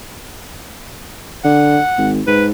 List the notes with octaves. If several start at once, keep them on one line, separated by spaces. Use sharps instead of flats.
D3 F#5
G#1
G#2 B4